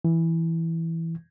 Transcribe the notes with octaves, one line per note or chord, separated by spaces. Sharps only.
E3